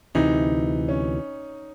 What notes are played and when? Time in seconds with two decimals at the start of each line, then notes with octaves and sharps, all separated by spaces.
0.15 D2 C3 E3 D#4
0.89 C#4